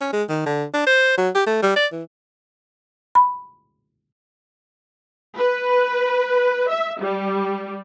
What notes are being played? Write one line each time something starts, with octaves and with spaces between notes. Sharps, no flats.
C#4
G#3
D#3
D3
D4
C5
F#3
G4
A3
G3
D5
E3
B5
B4
E5
G3